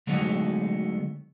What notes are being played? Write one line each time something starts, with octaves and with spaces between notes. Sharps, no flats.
D3 F#3 G#3 A3 B3 D#4